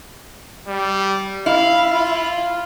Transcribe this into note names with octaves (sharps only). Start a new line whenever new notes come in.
G3
E4 F5
F4